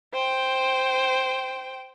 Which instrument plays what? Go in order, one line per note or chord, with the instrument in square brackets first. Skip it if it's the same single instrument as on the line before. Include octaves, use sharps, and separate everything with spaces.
[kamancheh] C5 G5